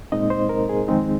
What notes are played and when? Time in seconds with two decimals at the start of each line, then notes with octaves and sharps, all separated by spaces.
0.12 A#2 G#3 C4 D#4 D#5
0.30 C5
0.49 A#4
0.69 G#4
0.88 F2 D#3 G#3 C4 D#4